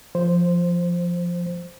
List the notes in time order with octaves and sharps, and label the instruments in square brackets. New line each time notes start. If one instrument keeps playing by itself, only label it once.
[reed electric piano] F3 C5